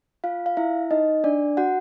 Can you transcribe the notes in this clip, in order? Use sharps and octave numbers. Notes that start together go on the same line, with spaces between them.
F4 F5
F5
E4 E5
D#4 D#5
D4 D5
F#4 F#5